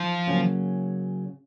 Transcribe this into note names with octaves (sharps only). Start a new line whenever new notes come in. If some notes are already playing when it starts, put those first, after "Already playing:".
Already playing: F3 D#4
C#3 F#3 A#3 C#4